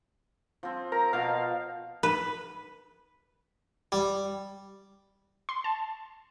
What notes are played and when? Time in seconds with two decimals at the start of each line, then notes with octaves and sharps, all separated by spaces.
0.63 F3 C4
0.92 A#4 A#5
1.13 B2 F3 F5
2.03 B4
3.92 G3
5.49 C6
5.64 A5